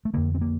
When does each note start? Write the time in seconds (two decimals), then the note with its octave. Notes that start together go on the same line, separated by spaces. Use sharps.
0.05 A3
0.14 F2 D3 A#3
0.34 C4
0.41 A#3